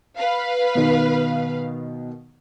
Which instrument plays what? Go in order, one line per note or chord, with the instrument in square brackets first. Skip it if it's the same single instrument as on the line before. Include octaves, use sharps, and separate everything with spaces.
[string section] B4 F5
[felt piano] B2 D#3